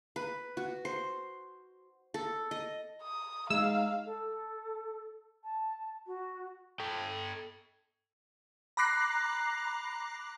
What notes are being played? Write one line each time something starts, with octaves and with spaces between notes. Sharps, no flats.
B4
F#4
C5
A4
D#5
D#6
G#3 D#4 F5 E6
A4
A5
F#4
A4 G5
A#5 B5 D6 F#6 A#6 C7